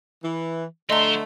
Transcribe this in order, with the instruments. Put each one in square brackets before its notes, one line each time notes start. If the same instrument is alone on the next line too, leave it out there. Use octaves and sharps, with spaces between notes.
[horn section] E3
[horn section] D3 A3 [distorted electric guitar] F3 C6 [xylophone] D#5 A#5